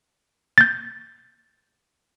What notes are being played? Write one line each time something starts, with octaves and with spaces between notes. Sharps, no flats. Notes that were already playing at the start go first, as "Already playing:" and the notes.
G6 A6